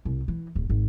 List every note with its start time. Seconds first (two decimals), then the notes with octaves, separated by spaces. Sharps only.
0.05 C2
0.28 E3
0.55 D1
0.70 G#1